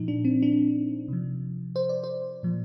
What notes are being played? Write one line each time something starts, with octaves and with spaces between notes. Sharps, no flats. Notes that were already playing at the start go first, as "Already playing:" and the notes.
Already playing: A#2 F3 D#4
D4
C4
D4
C3 F3
C5
D5
C5
A#2 F3